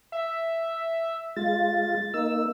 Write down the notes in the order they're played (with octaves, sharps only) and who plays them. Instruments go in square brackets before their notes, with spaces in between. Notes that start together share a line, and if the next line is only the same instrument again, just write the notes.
[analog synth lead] E5
[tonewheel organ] G#3 F4 [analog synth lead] A6
[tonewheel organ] A#3 D#4 [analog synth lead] E6